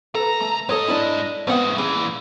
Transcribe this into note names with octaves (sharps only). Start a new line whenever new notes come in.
C#2 A4 B4 A#5
A3
G#2 A4 C#5 D#5
D4 E4
A2 G#3 B3 C4 F#5
A#2 E3 C#4 G#4